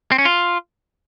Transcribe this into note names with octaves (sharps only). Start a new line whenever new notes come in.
C4
C#4
F4